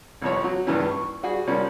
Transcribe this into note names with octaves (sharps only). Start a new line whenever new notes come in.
C2 F2 C#5
F#3
C#2 G2 A#2 E3 C#4
C#6
G3 F#4 G#4
C2 F3 G3 A#3 C#4